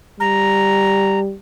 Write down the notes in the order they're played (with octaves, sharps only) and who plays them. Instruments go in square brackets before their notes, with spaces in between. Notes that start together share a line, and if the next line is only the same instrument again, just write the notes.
[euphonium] G3 [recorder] A#5